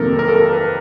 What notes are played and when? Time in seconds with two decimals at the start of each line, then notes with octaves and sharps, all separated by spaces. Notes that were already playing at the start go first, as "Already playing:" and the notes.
Already playing: F2 C3 D#3 F#3 A#3 A4 A#4
0.19 A#4
0.28 A4
0.36 A#4
0.53 B4